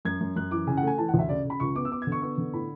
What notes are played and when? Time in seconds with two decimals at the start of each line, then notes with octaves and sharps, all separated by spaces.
0.05 F#2 G#6
0.21 F#2
0.36 F#2 F#6
0.51 E3 D6
0.67 C#3 G#5
0.77 F#5
0.83 A3 G#5
0.98 E3 A5
1.09 F#5
1.14 D2
1.19 E5
1.29 C#3 D5
1.45 C#3
1.50 B5
1.60 C#2 C#6
1.75 B3 D6
1.85 E6
1.91 B3 D6
2.02 D3 G#6
2.12 C#6
2.22 B3 C#6
2.38 D3
2.53 A2 B5